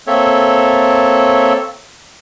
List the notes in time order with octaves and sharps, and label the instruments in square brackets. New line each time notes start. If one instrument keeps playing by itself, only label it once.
[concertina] A#3 C4 A4 C#5 E5